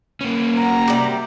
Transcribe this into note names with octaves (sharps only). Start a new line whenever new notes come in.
A#3 C#4 B4
C4 F#4 G4 A#5
C3 G3 A#4 E5